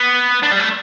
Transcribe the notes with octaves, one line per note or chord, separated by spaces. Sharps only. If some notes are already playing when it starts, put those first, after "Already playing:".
Already playing: B3
D4
G3
A3